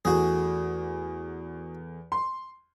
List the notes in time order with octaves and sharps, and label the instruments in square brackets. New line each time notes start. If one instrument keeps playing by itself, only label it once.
[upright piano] E2 A3 [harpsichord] F#4 G#4
[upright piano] C6